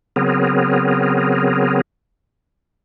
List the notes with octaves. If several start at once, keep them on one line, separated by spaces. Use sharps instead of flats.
C#3 F#3 B3 C4 G#4 A#4